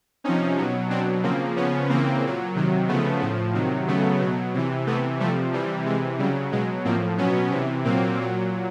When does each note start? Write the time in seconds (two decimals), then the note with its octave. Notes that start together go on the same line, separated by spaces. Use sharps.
0.24 C3 F3 C#4 D#4
0.57 B2 F#3
0.90 B2 F#3 C4 D4
1.23 C#3 F3 A#3 C4
1.56 C#3 F3 B3 C#4
1.89 C#3 E3 A#3 C4
2.23 A#2 F#3
2.55 C3 D#3 F#3
2.88 C#3 F3 A3 B3
3.21 A2 F3
3.54 C3 D#3 F#3
3.88 C#3 F#3 A3 B3
4.20 B2 F#3
4.54 C3 E3
4.87 C3 E3 A3 B3
5.20 C3 F3 G3 A3
5.53 C3 E3 G3
5.86 C3 E3 G#3
6.19 C#3 F#3 G3
6.52 B2 F#3 G#3
6.85 A2 F3 A#3 C4
7.18 B2 F#3 B3 C#4
7.51 C3 E3
7.84 A#2 F#3 A#3 C4
8.17 A#2 F#3